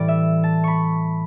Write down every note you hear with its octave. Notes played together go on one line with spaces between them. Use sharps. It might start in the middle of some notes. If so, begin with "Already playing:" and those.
Already playing: A2 E3 G3 D5
E5
A5
B5 C#6